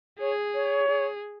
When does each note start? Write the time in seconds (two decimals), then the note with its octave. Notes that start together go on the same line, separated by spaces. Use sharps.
0.20 G#4 C#5
0.54 C#5
0.88 G#4